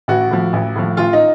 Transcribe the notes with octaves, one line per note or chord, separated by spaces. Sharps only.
A1 F#4
A2 F3
A1
A2 F3
A1 F4
D#4